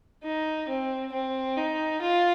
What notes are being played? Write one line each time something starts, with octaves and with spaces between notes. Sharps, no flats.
D#4
C4
C4
D#4
F4